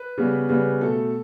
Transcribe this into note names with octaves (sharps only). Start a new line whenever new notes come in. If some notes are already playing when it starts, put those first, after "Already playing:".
Already playing: B4
C#3 G3 B3
C#3 G3 B3 B4
B2 A3 A4